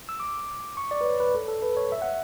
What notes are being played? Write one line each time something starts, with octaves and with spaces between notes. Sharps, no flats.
E6
D6
C#6
D5
B4
C#5
B4
A4
A4
B4
C#5
E5
F#5